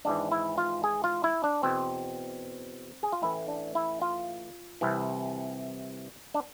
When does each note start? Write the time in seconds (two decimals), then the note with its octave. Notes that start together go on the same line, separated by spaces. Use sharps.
0.05 G#1 G#2 E3 D4
0.31 E4
0.58 F4
0.84 G#4
1.04 F4
1.24 E4
1.44 D4
1.63 E2 B2 C4
3.03 G#4
3.12 F4
3.22 A1 A2 E3 E4
3.48 D4
3.75 E4
4.01 F4
4.81 C2 C3 E3
6.34 D4